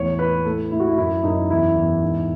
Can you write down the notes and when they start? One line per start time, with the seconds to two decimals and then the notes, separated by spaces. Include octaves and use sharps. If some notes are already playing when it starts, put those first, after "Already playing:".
Already playing: E2 A2 C#5
0.19 E3 B4
0.45 A2 A4
0.71 A2 E4
0.80 F#4
0.87 E4
0.97 F#2 E4
1.24 F#2 D#4
1.50 E2 E4
1.76 E2
2.02 G#2